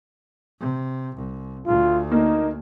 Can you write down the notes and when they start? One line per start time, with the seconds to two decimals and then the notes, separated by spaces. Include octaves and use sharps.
0.60 C3
1.16 C2
1.67 D2 F4
2.12 A#3 D#4